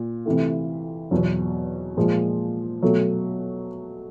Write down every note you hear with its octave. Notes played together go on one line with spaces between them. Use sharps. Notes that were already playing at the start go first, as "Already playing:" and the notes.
Already playing: A#2
C3 E3 A3
E2 B2 F#3
A#2 F3 G#3
B2 F#3 A3